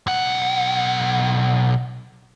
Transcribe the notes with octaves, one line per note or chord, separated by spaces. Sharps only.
B1 F#5